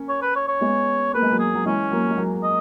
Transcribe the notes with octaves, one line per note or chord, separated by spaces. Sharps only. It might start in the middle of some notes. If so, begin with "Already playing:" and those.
Already playing: A#3 C#4
C#5
B4
C#5
C#5
G#3 B3
A#3 B4
G#3
F#3 A#3
G#4
F#3
E3 G#3 C#4
F#3 A#3
G#3
F#3 A#3
D#5